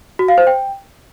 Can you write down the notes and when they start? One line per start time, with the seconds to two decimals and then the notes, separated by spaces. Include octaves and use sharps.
0.19 F#4
0.28 F5
0.38 C5
0.47 G5